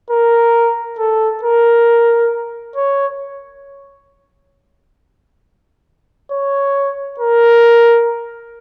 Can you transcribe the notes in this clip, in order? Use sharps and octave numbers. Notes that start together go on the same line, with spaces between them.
A#4
A4
A#4
C#5
C#5
A#4